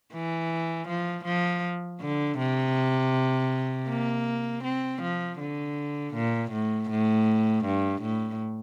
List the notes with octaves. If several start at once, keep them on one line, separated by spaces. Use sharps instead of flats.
E3
F3
F3
D3
C3
A#3
C4
F3
D3
A#2
A2
A2
G2
A2